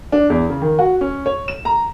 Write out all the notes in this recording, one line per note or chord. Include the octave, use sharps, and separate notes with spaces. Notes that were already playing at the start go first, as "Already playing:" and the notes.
D4
E2
C#3
D#3
F#4
C#4
C#5
E7
A#5